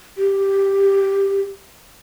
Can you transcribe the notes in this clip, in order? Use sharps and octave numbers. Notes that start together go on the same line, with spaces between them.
G4